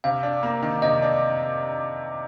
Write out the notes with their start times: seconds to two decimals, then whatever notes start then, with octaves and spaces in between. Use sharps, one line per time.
0.04 C3 F5
0.23 D4
0.43 A#3
0.62 D#3
0.82 C3 D#5
1.02 D4